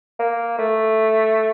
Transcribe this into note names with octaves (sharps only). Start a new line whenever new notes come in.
A#3
A3